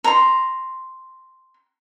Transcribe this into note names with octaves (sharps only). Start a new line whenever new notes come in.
A#5 C6